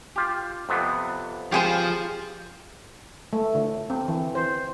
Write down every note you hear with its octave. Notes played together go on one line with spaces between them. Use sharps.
F4 G4
F2 C3 B3
F3 G4 G#4 C5
A3
D3
C4
E3
C5